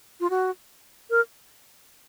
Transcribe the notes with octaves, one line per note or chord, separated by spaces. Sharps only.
F4
F#4
A#4